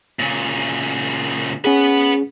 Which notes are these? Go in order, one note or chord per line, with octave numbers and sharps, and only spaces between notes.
A#2 C#3
C#4 G#4 B4 F#5